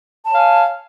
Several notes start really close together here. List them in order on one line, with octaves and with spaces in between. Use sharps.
A5 C#5 F5 G#5